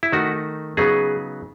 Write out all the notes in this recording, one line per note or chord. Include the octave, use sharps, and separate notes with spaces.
E4
D#3 A3 D#4 F#4
C#3 F#3 B3 D#4 G#4